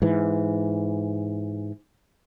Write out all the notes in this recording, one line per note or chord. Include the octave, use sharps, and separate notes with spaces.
G#2 E3